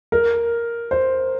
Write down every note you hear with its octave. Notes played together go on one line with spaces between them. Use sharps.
A#4
C5